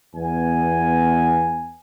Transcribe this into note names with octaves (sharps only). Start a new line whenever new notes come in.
E2 B3 G#5